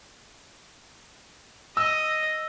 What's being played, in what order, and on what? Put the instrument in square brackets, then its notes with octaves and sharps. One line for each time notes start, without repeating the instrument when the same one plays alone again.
[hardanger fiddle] D#5 [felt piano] E6